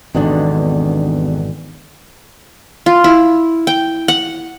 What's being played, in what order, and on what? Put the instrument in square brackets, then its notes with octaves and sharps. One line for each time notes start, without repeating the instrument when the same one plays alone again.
[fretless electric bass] G#1 B2 D3 [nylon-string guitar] E2 D#3 D4
[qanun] F4
E4
G5
F#5